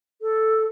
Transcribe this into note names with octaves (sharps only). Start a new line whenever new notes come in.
A4